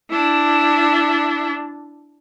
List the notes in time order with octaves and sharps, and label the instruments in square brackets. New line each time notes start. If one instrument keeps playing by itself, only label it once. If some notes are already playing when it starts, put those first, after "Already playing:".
[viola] D4 E4